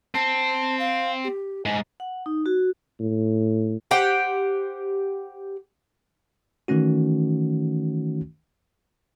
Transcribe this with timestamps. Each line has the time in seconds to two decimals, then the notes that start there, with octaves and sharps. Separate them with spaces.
0.15 C4 A5
0.79 F5
1.24 G4
1.65 G#2 G#5
2.00 F#5
2.26 D#4
2.46 F#4
3.00 A2
3.91 G4 C5 F#5 G5
6.68 D#3 E3 A3 C#4 F#4